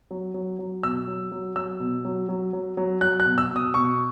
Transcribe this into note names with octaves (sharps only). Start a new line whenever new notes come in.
F#3
F#3
F#3
B2 E6
F#3
F#3
F#3 E6
B2
F#3
F#3
F#3
F#3
F#3 F#6
F#6
B2
E6
B2
D#6
B2 C#6